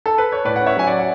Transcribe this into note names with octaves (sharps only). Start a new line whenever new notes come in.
A4
B4
C#5
A2 B4 D5
F#5
C#4
C#5 E5
F#3 G#5
D5 F#5
C#4
F#5